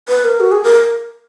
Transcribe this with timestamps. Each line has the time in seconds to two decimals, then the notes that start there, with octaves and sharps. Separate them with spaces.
0.09 B4
0.25 A#4
0.40 F#4
0.52 G#4
0.63 A#4